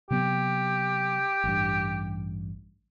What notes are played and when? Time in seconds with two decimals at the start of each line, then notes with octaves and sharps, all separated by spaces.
0.11 C3 F#3 B3 G4
1.44 A1 G2